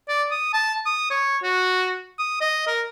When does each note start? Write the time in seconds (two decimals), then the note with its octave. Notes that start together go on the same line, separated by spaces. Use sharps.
0.09 D5
0.31 D#6
0.53 A5
0.86 D#6
1.10 C#5
1.43 F#4
2.19 D#6
2.41 D#5
2.67 A#4